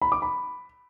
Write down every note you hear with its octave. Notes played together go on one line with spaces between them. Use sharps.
B5
D6
B5